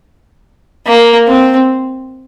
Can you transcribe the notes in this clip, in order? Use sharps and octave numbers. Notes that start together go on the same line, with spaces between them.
A#3
C4